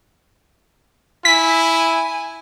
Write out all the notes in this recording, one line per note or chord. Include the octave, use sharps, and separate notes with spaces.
E4 G#5 B6